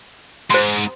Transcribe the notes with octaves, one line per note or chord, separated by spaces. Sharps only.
G#2 C5 C6